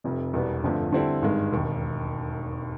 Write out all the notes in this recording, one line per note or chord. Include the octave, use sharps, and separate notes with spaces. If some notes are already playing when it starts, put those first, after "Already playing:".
F1 F2 C3
E1 E2 B2 G3 B3
G1 F2 D3 F3 A3
D3 G3 C4 E4 A4
G#1 G2 D#3 G#3
E1 D#2 D#3